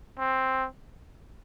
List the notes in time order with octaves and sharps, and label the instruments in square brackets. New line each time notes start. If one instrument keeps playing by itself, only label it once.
[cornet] C4